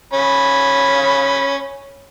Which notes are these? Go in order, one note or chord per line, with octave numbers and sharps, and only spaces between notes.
C#4 B5